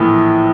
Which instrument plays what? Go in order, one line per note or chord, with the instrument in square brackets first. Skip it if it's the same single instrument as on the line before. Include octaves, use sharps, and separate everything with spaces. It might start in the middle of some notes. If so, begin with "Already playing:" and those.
Already playing: [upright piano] A#1 A2 E3